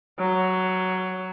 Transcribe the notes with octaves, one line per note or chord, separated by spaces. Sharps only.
F#3